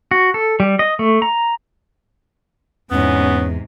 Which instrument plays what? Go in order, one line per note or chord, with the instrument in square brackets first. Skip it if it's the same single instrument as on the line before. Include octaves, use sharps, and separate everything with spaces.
[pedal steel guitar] F#4
A4
G3
D#5
A3
A#5
[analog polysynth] E2 [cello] G#2 C3 [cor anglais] B3 [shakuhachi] C#4